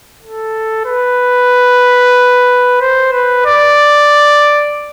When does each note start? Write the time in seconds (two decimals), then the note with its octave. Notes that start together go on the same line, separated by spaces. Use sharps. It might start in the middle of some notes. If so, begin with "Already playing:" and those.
0.22 A4
0.86 B4
2.81 C5
3.12 B4
3.46 D5